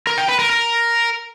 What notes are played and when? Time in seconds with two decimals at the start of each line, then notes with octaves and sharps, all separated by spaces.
0.07 A#4
0.18 G5
0.28 B4
0.39 A#4
0.50 A#4